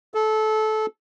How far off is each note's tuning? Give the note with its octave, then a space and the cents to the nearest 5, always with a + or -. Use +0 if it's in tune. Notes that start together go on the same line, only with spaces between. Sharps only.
A4 -20